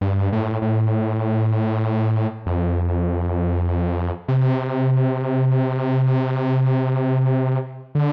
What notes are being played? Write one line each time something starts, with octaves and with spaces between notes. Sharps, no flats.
G2
A2
A2
F2
C3
D3